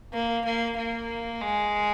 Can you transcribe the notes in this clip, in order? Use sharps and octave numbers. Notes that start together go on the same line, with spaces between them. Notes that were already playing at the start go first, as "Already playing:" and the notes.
A#3
A#3
A#3
G#3